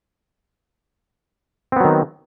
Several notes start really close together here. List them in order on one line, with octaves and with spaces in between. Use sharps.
C4 B3 F#3 D#3